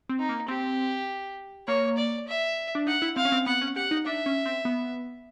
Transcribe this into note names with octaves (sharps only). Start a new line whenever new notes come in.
C4
D#4
A#3
C4 G4
A#3 C#5
D5
E5
D4
D#4 F#5
E4
C4 F5
C#4
C4
B3 F#5
C#4
G4 F#5
D#4
D4 E5
C#4
C4
B3